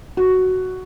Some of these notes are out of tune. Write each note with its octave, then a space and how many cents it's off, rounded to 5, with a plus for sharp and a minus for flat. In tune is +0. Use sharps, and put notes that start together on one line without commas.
F#4 +5